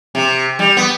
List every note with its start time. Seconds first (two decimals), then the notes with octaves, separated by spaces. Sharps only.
0.15 C3
0.59 G3
0.77 B3